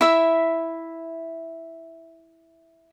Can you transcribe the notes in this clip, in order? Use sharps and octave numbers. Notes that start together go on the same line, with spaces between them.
E4 E5